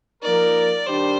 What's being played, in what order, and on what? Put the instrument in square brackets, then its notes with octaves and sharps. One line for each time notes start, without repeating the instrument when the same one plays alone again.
[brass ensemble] F3 A#3 D#4 A#4 [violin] D5
[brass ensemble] D#3 G3 D4 G4 [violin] C5